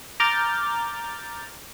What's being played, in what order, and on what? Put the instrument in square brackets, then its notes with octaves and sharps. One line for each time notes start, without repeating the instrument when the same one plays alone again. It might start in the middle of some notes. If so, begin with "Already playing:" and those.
[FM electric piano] A#5 D6 F6 G6 A6